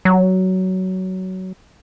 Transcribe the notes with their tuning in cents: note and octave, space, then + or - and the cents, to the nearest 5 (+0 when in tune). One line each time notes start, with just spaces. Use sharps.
F#3 +15